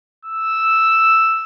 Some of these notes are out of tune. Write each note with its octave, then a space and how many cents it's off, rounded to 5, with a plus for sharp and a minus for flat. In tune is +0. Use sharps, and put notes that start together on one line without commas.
E6 +0